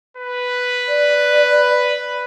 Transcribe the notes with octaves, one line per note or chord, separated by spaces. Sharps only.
B4
D5